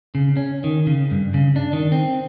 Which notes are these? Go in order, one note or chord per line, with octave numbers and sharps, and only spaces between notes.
C#3
C#4
D#3
C#3
G2
C#3
D4
D#3
C4